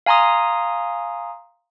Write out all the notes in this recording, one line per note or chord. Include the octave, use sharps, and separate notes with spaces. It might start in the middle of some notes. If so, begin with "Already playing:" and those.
F5 G#5 A#5 C6 D#6